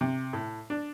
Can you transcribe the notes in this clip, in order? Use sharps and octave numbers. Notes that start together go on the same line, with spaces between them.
C3
A2
D4